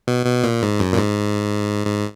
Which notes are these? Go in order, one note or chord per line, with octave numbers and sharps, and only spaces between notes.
B2
B2
A#2
G#2
F#2
A#2
G#2
G#2